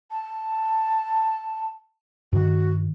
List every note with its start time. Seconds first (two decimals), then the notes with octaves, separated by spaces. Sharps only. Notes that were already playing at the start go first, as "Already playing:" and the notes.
0.11 A5
2.33 G2 D#3 F#4